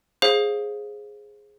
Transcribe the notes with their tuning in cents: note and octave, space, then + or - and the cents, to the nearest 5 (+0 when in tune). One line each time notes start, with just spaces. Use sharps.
G#4 +0 C5 +25 F5 +15